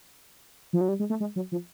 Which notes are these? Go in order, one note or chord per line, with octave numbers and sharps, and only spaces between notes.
F3
F#3
G3
G#3
A3
G#3
F#3
F3